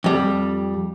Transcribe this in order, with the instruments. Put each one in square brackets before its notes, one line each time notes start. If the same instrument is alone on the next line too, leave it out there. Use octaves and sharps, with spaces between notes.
[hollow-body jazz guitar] F2 G3